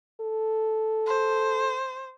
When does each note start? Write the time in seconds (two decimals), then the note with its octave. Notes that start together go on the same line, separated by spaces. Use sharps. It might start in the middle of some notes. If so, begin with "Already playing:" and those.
0.21 A4
1.07 C5